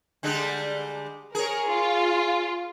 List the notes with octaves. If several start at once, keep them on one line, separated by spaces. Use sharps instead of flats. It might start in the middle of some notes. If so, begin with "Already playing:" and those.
D3 G3 G#3
G#4 A#4 C#5
F4